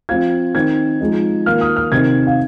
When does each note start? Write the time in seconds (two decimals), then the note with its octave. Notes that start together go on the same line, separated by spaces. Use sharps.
0.09 F3 C4 F4 G#6
0.54 D#3 C4 D#4 G#6
1.01 F3 G#3 D#4
1.46 D#3 A#3 F4 F6
1.61 D#6
1.76 F6
1.92 C3 D#3 C4 D#4 G#6
2.27 F5